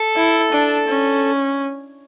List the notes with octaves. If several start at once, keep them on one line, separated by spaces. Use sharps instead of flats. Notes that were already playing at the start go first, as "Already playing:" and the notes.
Already playing: A4
E4
D4
C#4